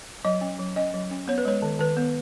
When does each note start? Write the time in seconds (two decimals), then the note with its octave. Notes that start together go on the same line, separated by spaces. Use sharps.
0.25 F#3 D#5
0.41 C#4
0.59 F#3
0.76 C#4 D#5
0.94 F#3
1.11 C#4
1.28 B3 C#5
1.38 B4
1.45 G#3 C#5
1.62 D#3
1.79 D#3 B4
1.97 B3